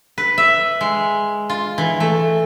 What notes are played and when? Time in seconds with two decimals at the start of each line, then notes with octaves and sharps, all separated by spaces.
0.18 B4
0.38 E5
0.81 G#3
1.50 F4
1.78 E3
2.00 A3